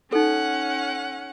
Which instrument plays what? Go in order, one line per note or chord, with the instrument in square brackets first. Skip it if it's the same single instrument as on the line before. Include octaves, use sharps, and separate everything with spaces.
[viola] C#4 F#5 [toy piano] D#4 A4